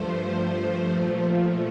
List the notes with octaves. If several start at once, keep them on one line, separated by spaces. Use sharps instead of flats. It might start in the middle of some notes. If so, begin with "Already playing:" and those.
Already playing: G2 F3 A3 C5
A#2 F3 A3